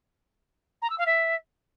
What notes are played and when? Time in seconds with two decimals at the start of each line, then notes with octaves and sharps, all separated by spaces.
0.82 A#5
0.90 E6
0.98 F5
1.06 E5